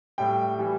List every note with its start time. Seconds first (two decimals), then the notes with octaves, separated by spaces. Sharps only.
0.18 A2 G3 G5
0.59 E3 G3